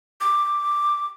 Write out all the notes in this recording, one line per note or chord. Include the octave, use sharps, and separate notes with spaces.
D6